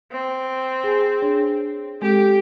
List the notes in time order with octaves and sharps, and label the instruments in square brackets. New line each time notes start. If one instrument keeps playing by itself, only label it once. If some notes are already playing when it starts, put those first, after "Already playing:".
[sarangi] C4
[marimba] G#4 G#5
D4 G#4 C#5
[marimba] G#3 C4 A4 [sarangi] G4